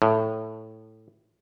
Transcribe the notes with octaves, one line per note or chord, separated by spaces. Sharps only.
A2